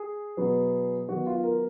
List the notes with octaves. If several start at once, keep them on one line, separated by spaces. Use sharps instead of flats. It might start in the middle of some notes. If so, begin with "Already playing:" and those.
Already playing: G#4
B2 F#3 B3
D#3 F#3 B3 F#4
F4
A#4